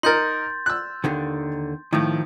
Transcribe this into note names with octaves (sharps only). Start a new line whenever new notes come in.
D#4 A#4 C6 G6 A6
E6 F#6
D#2 D3 D#3
A2 D#3 F3